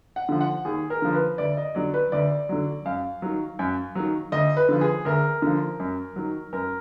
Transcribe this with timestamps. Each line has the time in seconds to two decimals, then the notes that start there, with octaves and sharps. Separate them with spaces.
0.16 F#5
0.29 D3 F3
0.41 F#5
0.65 D#2 G#4
0.90 A#4
1.02 D3 F3
1.14 B4
1.38 D2 D5
1.57 D#5
1.75 D3 F#3 D5
1.94 B4
2.12 D2 D5
2.49 D3 F#3
2.85 F#2 F5
3.22 D#3 F#3
3.59 F#2
3.95 D#3 F#3
4.32 D2 D#5
4.57 B4
4.69 D3 F3
4.81 G#4
5.05 D2 A#4
5.42 D3 F3
5.80 F#2
6.16 D#3 F#3
6.53 F#2 A#4